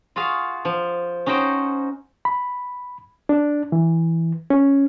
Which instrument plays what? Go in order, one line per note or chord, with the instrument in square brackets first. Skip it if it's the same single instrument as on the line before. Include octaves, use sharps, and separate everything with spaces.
[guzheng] F4 F#4 G#4 F5
F3
C#4 D#4 F#4 C5 G5
[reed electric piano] B5
D4
E3
C#4